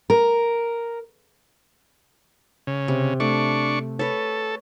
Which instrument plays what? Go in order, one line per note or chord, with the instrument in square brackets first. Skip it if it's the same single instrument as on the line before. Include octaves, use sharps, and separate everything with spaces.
[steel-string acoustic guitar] A#4
[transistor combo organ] C#3
[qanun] C3
[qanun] A3 [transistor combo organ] D4 C#6
[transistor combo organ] A4 [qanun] B4 C#5